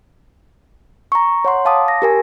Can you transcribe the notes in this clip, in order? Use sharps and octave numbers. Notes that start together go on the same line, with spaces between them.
A#5 C#6
C#5 F#5 C6
F5 A5 D6 D#6
A#6
G4 A#4 G#5